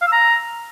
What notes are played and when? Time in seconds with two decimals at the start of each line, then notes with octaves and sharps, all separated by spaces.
0.02 F5
0.07 E6
0.12 A#5